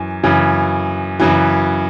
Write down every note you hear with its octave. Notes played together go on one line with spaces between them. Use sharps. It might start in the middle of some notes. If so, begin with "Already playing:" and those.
Already playing: F#2 E3
F#2 C#3 E3
F#2 C#3 E3